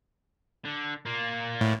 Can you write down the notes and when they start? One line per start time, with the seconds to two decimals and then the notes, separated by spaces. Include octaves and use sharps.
0.65 D3
1.06 A#3 F4
1.61 A2